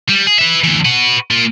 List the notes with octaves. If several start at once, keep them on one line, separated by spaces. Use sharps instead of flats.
G3
G#4
B4 E5
D2 E3
F#4 B4
A#3 F4